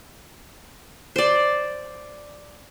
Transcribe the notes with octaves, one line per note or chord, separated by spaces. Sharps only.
C5 D5